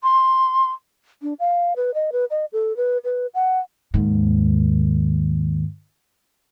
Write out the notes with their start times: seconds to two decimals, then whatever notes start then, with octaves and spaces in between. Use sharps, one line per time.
0.03 C6
1.22 D4
1.40 F5
1.76 B4
1.94 D#5
2.12 B4
2.31 D#5
2.53 A4
2.77 B4
3.04 B4
3.34 F#5
3.94 D#2 G#2